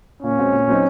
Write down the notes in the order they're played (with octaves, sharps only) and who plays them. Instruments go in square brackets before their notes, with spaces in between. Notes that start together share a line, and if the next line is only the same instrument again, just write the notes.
[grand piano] A#2 [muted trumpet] C#4
[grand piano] G#3 C4 F#4
A#2
F#3 C4 D#4